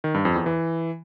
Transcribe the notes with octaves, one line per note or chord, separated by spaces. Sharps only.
D#3
G2
F2
E2
E3